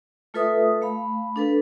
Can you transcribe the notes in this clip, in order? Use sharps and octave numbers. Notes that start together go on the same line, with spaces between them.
A3 F4 A4 B4 E5 D#6
A3 F5 B5
D4 A4 B4